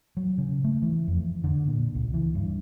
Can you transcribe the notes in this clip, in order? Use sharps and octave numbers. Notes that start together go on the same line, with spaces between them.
F#3
C#3
A3
E3
F2
D3
A#2
C#2
E3
G2